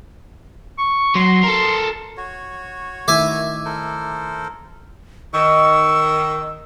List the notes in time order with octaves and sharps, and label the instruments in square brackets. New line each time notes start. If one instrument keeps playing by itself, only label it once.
[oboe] C#6
[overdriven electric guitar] F#3 [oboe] C6
[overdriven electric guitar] A4 A#4
[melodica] F#4 C#5
[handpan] D#3 A3 E4 [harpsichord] E5 G#5 [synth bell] D6
[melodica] A4 A#4 C5
[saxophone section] D#3 [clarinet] C#6 [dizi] E6